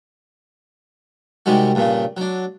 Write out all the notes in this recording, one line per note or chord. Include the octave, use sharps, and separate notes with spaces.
C3 D#3 G3 G#3 F#4
G2 A#2 C#3
F#3 D4